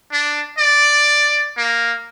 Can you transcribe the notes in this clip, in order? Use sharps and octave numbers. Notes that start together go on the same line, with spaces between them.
D4
D5
A#3